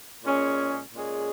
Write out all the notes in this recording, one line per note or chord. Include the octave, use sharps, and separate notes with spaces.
A#2 G#3 C#4 G#4
A#2 G#3 C#4 G#4